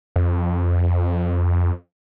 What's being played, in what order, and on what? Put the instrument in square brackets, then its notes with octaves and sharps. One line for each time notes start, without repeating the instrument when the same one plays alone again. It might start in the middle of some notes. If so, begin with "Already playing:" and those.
[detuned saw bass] F2